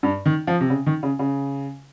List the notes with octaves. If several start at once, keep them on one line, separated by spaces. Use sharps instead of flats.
G2
D#3
F3
C3
C#3
D#3
C#3
C#3